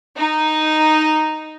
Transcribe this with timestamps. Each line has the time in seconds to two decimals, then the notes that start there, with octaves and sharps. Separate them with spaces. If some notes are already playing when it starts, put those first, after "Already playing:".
0.17 D#4